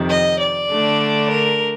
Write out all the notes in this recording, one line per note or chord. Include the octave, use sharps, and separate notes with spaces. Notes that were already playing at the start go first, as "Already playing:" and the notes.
Already playing: F2 C3 D#3
D#5
D5
D3 A3 D4
A#4